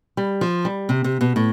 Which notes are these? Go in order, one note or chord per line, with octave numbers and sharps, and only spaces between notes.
G3
F3
G3
C3
C3
B2
A2